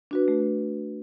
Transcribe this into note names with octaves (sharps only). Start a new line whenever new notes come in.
D4 F#4 B4
A3